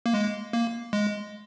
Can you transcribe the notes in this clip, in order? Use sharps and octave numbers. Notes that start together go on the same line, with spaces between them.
A#3
G#3
A#3
G#3